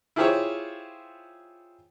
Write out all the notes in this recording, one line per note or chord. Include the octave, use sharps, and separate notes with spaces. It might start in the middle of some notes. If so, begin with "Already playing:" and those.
E4 F4 G4 G#4 C5 C#5